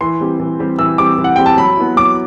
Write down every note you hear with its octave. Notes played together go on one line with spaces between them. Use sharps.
E3 C6
G3 C4 G4
E3
G3 C4 G4
E3 E6
G3 C4 G4 D6
E3
F#5
G3 C4 G4 G5
A5
F#3 B5
B3 E4
F#3 D6